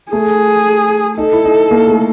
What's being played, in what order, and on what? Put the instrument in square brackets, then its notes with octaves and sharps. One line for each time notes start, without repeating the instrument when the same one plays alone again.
[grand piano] A3 [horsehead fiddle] G#4
[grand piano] D#4 [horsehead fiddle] A4
[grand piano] E4
D#4
A#3
A3